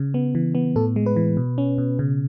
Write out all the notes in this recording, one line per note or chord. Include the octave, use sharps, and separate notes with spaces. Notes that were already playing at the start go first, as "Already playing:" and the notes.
Already playing: C#3
B3
E3
B3
A2 A4
G#3
B4
E3
B2
C#4
B2
C#3